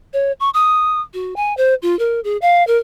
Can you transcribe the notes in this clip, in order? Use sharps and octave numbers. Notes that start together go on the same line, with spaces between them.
C#5
C#6
D#6
F#4
G#5
C5
F4
A#4
G#4
F5
A#4